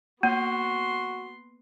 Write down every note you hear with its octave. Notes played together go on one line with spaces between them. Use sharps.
A#3 B3 F#4 C6